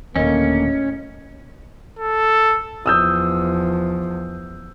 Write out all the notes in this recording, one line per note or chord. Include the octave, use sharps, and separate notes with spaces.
D#1 D#2 A2 D3 A3 A#3 C#4 D#5
A4
E2 F3 D#6 E6 G6